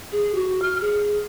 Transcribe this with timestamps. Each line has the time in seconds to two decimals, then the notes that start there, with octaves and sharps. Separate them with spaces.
0.13 G#4
0.35 F#4
0.62 F6
0.81 G#4